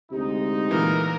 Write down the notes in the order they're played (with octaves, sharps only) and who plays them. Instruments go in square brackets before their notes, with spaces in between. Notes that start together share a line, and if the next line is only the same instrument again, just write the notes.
[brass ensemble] D2 G#3 D#4 [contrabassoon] C3
[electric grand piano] A#2 E3 [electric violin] A#4